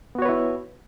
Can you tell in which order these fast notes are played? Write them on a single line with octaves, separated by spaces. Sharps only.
B3 F#4 C#5 B4 E4